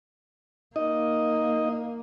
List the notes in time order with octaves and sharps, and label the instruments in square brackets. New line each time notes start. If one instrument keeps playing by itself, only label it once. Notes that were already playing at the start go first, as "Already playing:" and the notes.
[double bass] A#3 [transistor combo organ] D#4 D#5